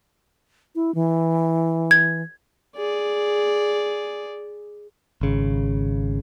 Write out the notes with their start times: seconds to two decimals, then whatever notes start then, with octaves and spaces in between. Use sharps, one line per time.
0.75 E4
0.95 E3
1.91 G#6
2.77 G#4 D5
5.21 G#1 C#3